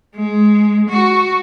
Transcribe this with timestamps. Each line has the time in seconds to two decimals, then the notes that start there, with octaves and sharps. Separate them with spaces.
0.16 G#3
0.89 F#4